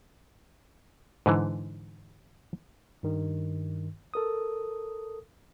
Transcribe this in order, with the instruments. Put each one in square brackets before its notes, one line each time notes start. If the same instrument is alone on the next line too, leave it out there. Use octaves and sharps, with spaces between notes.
[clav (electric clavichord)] G#2 D3 E3
[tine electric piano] G2 D#3
A4 A#4 D#6